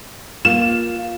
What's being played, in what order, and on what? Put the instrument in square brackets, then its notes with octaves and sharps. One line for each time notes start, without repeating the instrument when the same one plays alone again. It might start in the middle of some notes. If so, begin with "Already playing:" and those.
[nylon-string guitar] A#3 F4 [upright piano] E7